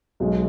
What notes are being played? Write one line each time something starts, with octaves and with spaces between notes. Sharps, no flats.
B1 B2 G#3